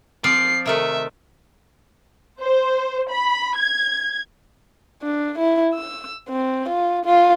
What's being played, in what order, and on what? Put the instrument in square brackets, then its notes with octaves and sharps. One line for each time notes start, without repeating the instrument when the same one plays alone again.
[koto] F3 C4 D5 [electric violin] C7
[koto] C3 D#3 A3 [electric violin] E5
[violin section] C5
B5
G#6
[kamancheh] D4
E4
E6
C4
F4
F4